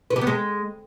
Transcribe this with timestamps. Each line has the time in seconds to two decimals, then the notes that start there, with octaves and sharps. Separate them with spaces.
0.10 B4
0.16 G4
0.21 B3
0.27 G#3